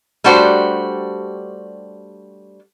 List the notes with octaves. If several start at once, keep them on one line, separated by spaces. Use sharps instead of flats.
G3 A3 D4 F#4 G4 C5